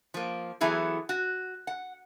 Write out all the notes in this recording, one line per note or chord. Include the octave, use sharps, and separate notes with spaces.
F3 A#3
E3 F#3 B3 E4 G#4 A4
F#4
F#5